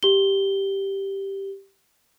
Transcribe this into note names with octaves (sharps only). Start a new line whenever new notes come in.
G4 G7